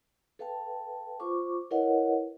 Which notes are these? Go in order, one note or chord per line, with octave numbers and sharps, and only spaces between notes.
A4 B4 F5 G5 A5
F4 C5 C#6 D6
E4 A#4 B4 C#5 D#5 F#5